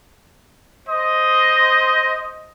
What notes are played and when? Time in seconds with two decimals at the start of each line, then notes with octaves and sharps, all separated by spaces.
0.88 C5 D#5